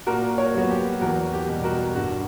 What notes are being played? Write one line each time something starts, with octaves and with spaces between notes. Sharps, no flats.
A#2 F#4 A#4
A#4 C#5
F#3 B3 F#4
G4
E2 F#4 A#4
G4
B2
G3
F#4 A#4
G2 F#4